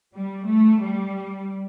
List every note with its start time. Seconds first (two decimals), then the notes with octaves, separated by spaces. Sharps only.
0.15 G3
0.48 A3
0.82 G3